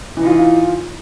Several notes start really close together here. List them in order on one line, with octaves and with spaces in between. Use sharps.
E3 D#4 F4